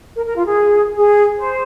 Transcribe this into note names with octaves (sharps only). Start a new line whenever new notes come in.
A#4
A#4
F4
G#4
G#4
C5